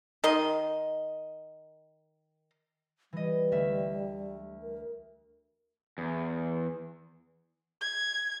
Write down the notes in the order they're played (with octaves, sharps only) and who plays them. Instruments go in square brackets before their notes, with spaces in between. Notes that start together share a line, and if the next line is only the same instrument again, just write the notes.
[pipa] D#3 D#5 C6
[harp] E3 D#5 [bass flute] G3
[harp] D2 A3 E5
[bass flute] A#4
[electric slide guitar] E2
[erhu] G#6